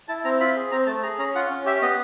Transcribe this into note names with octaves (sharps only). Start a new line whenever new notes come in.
E4 A5
C4 A#5
F4 B5
G#4
C4 A#5
A3 A5
G#4 A#5
C#4 A#5
F4 F#5
C#4
G4 E5
B3 D#5